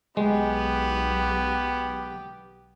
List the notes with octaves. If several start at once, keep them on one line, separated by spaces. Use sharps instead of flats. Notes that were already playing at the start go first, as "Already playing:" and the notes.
B1 G#3 B3 G4